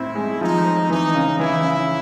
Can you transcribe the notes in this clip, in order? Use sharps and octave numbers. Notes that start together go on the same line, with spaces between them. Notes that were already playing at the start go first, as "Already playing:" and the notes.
Already playing: A2 C4 E4
G#3
F3 D#4
C4
E3 D#4
C#3
E3 E4
C#3